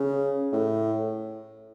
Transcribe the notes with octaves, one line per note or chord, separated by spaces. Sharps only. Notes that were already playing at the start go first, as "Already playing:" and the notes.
Already playing: C#3
A2